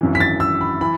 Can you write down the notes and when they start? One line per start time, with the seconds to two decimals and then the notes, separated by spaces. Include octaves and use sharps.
0.01 G#1 F#2 E3
0.15 B6
0.20 A6
0.40 E6
0.61 B5
0.81 E3 B5